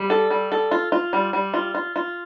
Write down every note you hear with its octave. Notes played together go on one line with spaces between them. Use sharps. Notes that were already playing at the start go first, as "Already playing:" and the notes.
Already playing: G3
A4
G3
A4
F4
F4
G3
G3
F4
F4
F4